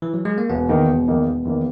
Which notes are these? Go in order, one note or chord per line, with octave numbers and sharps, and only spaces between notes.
E3
F#3
G#3
A#3
E1 B3
E2 D#3 A#3 D#4
E1
E2 D#3 A#3 D#4
E1
E2 D#3 A#3 D#4